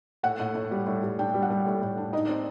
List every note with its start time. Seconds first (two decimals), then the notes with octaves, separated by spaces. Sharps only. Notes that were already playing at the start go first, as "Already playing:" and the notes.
0.23 A2 F#5
0.39 A2
0.55 A2
0.71 G3
0.87 A2
1.03 G3
1.19 D4 G5
1.34 G3
1.42 F#5
1.50 G3
1.66 A2
1.82 A2
1.97 D4
2.13 D#4 D#5
2.25 D5
2.29 C4